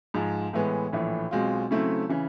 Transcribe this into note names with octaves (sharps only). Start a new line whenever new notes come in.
G#2 F3 G#3
A2 E3 G#3 B3
A#1 A2 E3
B1 B2 G#3 C4 F4
C#3 F#3 A3 C4 E4
C#3 E3